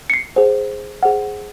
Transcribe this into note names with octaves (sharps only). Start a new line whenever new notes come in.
C#7
C7
G#4 C5 F#5
G#4 C5 F#5